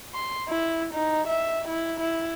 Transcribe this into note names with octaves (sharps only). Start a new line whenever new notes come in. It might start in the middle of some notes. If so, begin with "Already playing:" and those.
C6
E4
D#4
E5
E4
E4